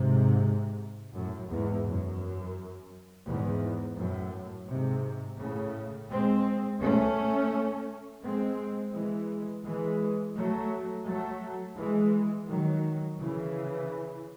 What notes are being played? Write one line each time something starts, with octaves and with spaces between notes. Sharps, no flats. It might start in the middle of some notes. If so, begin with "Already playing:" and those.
Already playing: G#2 C3
F#2 A2
E2 G#2
F#2
E2 G#2
F#2 A2
G#2 C3
A2 C#3
G#3 C4
A3 C#4
G#3 C4
E3 G#3
E3 G#3
F#3 A3
F#3 A3
E3 G#3
D#3 F#3
C#3 E3